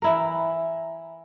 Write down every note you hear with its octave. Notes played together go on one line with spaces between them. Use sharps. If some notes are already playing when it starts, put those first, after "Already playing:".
E3 E4 A#4